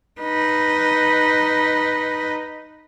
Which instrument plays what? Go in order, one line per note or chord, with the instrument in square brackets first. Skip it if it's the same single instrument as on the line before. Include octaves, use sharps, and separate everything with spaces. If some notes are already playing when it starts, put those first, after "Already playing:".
[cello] D#4 B4